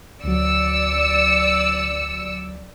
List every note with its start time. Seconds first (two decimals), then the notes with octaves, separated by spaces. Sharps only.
0.24 D2 F#3 D5 E6 C#7